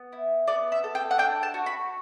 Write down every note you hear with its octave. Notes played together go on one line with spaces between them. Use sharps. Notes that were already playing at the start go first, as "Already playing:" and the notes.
Already playing: B3
E4
B3 D5
E5
A4
G5
F#5
D4 G5
A5
F#4
B5